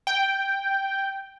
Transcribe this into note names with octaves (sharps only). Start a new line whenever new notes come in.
G5